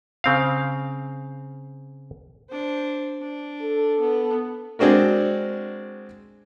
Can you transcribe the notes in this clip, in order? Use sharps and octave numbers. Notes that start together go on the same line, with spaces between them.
C#3 C4 F5
D4 C5
D4
A4
B3
G#3 C4 D4 F#4 A#4